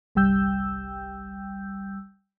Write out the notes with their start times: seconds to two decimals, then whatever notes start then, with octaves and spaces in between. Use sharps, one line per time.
0.15 G1 C2 G3 G5 E6 G6